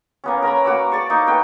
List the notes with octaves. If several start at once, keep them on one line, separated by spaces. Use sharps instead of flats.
A#3 B3 C#4
A#4 C#5 A#5 B5
A#3 F#4 D6 E6
D5 A5 C#6
A#3 D#4
F#4 A4 B4 G5